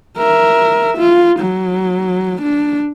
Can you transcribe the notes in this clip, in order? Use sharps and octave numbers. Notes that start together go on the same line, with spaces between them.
A#4 E5
F4
F#3
D4